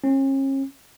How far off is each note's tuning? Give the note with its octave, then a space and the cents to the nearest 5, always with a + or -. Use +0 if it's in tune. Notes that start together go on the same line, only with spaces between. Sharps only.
C#4 -40